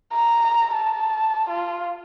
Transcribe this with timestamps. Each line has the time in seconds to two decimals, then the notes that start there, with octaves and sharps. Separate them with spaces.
0.13 A#5
0.74 A5
1.49 F4